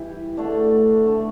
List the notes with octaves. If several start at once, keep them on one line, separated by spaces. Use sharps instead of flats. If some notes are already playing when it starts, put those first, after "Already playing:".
Already playing: E3 G3 E4 G4
D3 A3 D4
D3 A3 D4